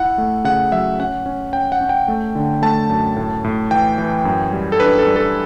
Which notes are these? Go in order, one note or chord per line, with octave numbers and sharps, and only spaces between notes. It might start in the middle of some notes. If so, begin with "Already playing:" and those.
Already playing: E4 F#5
A3
C#3 F#5
F#3 E5
C#4 F#5
C#4
C#4 G5
F#5
C#4
G5
A3
D3
A3 A5
F#2
A2
A2
E3 G5
E3
F#2
G3
A4
D4 B4
A4
G3
A4